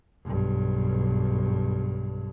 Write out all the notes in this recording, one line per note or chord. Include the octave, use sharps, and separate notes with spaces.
B1 G2